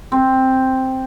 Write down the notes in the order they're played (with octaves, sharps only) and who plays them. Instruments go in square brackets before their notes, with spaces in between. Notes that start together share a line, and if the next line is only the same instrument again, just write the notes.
[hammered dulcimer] C4